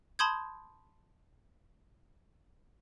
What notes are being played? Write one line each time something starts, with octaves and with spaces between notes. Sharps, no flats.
A5 B5 C6 D#6 G6 G#6